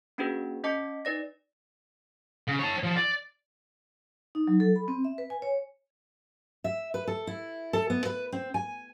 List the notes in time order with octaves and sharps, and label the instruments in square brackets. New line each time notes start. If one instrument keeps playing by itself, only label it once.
[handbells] A#3 C#4 D4 F#4 G#4 B4
C#4 D#5 A5 D6 B6 C#7
D#4 B4 D5 A#6
[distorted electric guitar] C#3
C#5 A5
F3
D5
[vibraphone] D#4
F#3
A4
B5
C4
E5
B4
G#5
C#5
[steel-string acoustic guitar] E5
B4
A4
E4
A4
B3
B4
C4
G#5